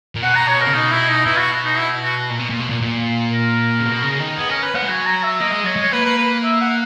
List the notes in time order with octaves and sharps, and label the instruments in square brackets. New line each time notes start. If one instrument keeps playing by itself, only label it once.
[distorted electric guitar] A#2
[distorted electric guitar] B2 [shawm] F#5
[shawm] A#5
C#5
A#4
[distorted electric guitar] C#3
[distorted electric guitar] B2 [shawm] D#4
[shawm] E4
D#4
[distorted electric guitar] B2 [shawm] E4
[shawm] F#4
D#4
E4
F#4
[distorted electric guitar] A#2
B2
A#2
B2
A#2
A#2
[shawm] A#4
[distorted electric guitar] C#3
B2
C#3
D#3
[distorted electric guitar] B3 [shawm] G#4
[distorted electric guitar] C#4 [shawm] A#4
[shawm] B4
[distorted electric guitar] B3 [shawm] F#5
[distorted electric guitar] G#3
[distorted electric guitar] F#3 [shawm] G#5
[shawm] A#5
E5
[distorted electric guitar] A#3 [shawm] D#5
[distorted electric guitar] G#3
[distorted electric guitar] F#3 [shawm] C#5
[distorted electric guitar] G#3
[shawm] C#5
[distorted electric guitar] A#3 [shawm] B4
[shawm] B4
B4
E5
F#5